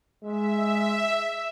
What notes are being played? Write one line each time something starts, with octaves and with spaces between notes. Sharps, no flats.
G#3 E5